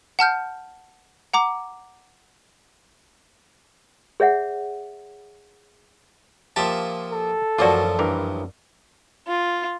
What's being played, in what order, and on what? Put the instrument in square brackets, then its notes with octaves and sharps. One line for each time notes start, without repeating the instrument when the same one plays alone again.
[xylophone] F#5 A5 F6 G6
F#5 A#5 D6
[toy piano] G#4 C#5 E5 F#5
[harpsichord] A#2 F3 E5 [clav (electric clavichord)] G4 A5
[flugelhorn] A4
[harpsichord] A1 F#2 F3 [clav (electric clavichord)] F4 F#4 [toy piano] D5 A5 D6
[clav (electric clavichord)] G2 E3 A#4 [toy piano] D6
[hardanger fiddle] F4